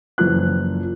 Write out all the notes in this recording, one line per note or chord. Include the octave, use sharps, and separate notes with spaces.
F#1 E3 F3 F#6